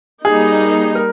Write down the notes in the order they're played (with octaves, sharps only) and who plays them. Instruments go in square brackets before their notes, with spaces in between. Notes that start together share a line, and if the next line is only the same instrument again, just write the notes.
[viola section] G3 A#3 D#4 [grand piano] G#4
[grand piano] A#4